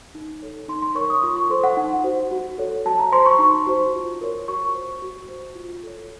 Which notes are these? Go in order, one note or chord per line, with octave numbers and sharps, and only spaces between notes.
D#4
A4 C#5
D#4 C6
C6
A#4 C#5 C#6
D#6
F4 C#6
C#6
A4 C5 C6
F#5
D#4 F#5
F#4 C5
F#4
A4 C#5
F#4 A5
A#5
C5 C6
C#6
D#4
F#4 C5
F4
A#4 C#5
F#4 C#6
C5
F#4
C5
F4
A4 C#5